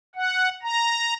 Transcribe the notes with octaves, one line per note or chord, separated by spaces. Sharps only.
F#5
A#5